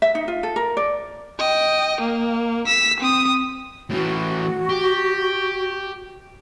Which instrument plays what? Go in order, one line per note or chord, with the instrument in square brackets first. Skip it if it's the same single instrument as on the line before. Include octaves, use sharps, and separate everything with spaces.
[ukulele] E5
D#4
F4
A4
A#4
D5
[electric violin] D#5 G5
A#3
E6 B6
C4 D#6
[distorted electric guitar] A2 E3 [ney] F#4
[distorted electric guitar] G4